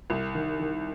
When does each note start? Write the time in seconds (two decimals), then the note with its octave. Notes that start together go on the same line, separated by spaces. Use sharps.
0.10 C2
0.35 D#3
0.60 D#3